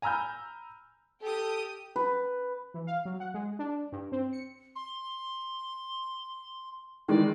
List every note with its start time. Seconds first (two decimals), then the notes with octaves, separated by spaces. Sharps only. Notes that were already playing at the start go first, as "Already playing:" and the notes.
0.02 G#5 A#5 B5 E6 F6 G6
1.22 G4 A4 D#6
1.96 B4
2.74 E3
2.87 F5
3.05 F#3
3.20 F#5
3.34 G#3
3.59 D4
3.92 G2
4.12 C4
4.33 C#7
4.76 C6
7.08 D#3 E3 G#3 D5